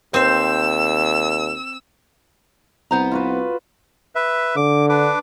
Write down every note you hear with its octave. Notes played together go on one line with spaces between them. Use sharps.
D#2 C4 C5 E6
C2 B3 C5 A#5
F4 F#4 B4
B4 E5
D3 D6
D4 B4 D6